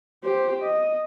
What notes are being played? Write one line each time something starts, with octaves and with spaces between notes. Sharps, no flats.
G4 C5
D#5